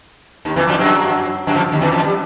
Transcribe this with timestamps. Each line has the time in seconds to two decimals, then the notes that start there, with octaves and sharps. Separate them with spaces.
0.45 D#2 D#3
0.56 E2 E3
0.68 F2 F3
0.79 F#2 F#3
1.47 F#2 F#3
1.55 F2 F3
1.72 D#2 D#3
1.81 E2 E3
1.92 F2 F3
2.03 G3